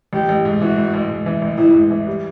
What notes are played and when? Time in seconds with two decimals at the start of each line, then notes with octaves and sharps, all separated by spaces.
0.13 A1 G4
0.29 A1
0.45 G#2
0.61 E3 F#4
0.78 A1
0.94 A1
1.10 G#2
1.26 E3
1.42 A1
1.58 A1 E4
1.74 G#2
1.90 E3
2.07 G3